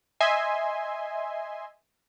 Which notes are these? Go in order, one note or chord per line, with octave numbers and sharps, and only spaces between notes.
D#5 E5 G#5 C6